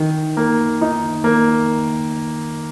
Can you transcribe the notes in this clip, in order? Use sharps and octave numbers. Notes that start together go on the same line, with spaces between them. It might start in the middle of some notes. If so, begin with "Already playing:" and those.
Already playing: D#3
A#3
D#4
A#3